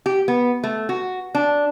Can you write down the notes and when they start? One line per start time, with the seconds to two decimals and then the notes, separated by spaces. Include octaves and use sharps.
0.06 G4
0.28 B3
0.64 A3
0.89 F#4
1.35 D4